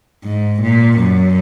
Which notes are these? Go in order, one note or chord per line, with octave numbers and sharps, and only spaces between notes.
G#2
A#2
F#2